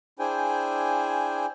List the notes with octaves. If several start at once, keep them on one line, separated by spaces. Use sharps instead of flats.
D4 E4 G#4 C5 G5 G#5